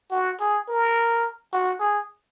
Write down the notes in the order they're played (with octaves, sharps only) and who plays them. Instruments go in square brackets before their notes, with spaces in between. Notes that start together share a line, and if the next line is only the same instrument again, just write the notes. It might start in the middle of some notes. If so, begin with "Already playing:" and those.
[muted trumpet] F#4
G#4
A#4
F#4
G#4